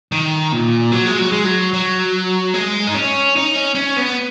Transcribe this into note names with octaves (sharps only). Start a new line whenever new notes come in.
D#3
A#2
F#3
G#3
F#3
G#3
F#3
F#3
G#3
D#4
C#4
D#4
C#4
C#4
B3